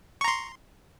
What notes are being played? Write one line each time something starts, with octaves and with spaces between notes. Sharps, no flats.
A#5 C6 C#6